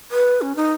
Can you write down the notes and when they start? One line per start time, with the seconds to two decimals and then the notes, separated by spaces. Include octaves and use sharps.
0.11 B4
0.42 C#4
0.56 D#4